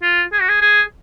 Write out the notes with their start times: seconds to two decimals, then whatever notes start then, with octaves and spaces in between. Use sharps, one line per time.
0.02 F4
0.33 G#4
0.41 F#4
0.49 G#4
0.61 G#4